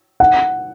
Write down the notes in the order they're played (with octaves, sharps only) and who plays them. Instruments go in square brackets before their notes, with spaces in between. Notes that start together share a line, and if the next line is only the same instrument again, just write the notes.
[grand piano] F#5